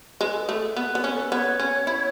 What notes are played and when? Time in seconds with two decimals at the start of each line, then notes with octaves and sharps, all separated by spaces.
0.20 G#3 B4
0.33 A4
0.44 A3 G#4
0.55 A4
0.76 B3 B4
0.95 B3
1.04 C#4
1.11 A4
1.21 B4
1.32 B3 C#5
1.60 C#4
1.87 E4